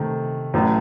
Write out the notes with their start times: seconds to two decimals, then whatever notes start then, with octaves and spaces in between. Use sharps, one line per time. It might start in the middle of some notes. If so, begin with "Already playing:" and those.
Already playing: C3 D#3 A3
0.54 A1 A2 F#3